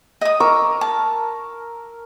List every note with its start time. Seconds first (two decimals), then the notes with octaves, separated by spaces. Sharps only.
0.21 D#5 D#6
0.40 A#4 C#6 D6 E6
0.81 A5